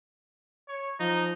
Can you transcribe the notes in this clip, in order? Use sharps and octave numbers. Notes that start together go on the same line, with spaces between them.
C#5
F3 D#4